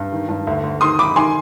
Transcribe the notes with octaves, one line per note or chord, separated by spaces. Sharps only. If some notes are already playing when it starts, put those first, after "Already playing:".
Already playing: G2
D#3
G2
D2
D2
D#3 C6 D#6
D#3 B5 D6
D#3 G#5 C6